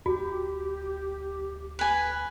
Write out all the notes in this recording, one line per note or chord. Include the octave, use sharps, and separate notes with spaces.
D2 F#4 G4
B4 G#5